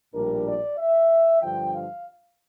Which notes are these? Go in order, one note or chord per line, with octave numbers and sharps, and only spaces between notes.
A#1 A2 G3 D4 A#4
D5
E5
G2 D3 F3 G5
F5